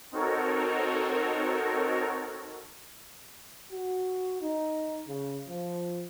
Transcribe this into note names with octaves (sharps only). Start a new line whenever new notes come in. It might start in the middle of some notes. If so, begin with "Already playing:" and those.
C4 D#4 F#4 A4 A#4 C#5
F#4
D#4
C#3
F3